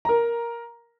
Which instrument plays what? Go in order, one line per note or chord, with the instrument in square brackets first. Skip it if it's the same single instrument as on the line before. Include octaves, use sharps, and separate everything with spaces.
[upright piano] A#4 A#5